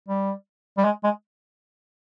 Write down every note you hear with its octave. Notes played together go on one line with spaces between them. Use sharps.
G3
G3
G#3
G#3